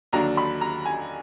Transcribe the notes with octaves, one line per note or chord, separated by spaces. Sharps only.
D#2 D3 F#3 D4 A#5
B5
A#5
G#5